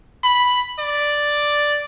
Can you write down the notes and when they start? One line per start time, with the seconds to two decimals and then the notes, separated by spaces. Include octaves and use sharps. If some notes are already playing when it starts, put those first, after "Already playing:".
0.24 B5
0.79 D5